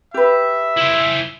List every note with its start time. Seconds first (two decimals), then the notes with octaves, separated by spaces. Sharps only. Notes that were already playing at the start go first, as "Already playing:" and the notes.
0.14 G4 B4 E5
0.77 E4 C5